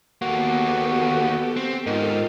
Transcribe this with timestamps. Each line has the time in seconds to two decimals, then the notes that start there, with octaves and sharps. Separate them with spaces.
0.22 D#2 A#3 B3 F#4 G4 A4
1.57 C4 G4
1.87 G#2 D#3 F4 A4 F5